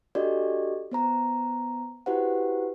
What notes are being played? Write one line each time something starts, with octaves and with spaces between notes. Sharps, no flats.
D4 F#4 G4 A4 D5 D#5
B3 C5 A#5
E4 F#4 G4 B4 C5 F#5